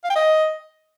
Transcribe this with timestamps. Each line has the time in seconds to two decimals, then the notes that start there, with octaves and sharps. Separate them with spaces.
0.04 F5
0.10 G5
0.16 D#5